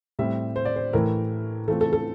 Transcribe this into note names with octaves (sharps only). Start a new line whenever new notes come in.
A2 G3 C4 E5
C5
D5
C5
A2 E3 A3 E4 A#4
E3 A3 C4 F4 A4
A4
A4